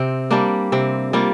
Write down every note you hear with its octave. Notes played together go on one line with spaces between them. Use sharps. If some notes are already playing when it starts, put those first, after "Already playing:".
Already playing: C3 C4
G3 A#3 D4
C3 C4
G3 A#3 F4